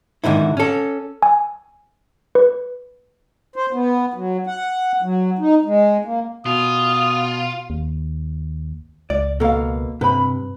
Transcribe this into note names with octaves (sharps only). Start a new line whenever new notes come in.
G#2 D3 D#3 E4
C#4 A4
G#5
B4
C5
B3
F#3
F#5
F#3
D#4
G#3
A#3
B2 F4 D#6
D#2
C#2 D5
B2 A#3 A4 F5
G2 C3 B4 B5